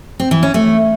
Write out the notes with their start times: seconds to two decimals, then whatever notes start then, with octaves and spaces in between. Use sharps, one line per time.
0.20 C4
0.31 E3
0.43 C#4
0.54 A3